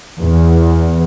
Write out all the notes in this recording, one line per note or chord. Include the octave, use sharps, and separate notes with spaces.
E2